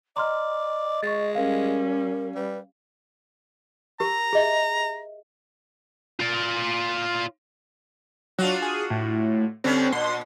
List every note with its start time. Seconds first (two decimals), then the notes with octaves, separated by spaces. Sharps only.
0.16 D5 D#5 A#5 C6 F6
1.03 G#3 C#6 A6
1.35 G3 C#4 A#4 F5
2.35 G3 B4
4.00 G4 A#4 A#5
4.33 G#4 D#5 E5
6.20 F4 D5
8.39 F#3 D4 F4 F#4
8.62 G#4
8.90 A2
9.64 D3 G3 C4 C#4
9.92 A#2 C6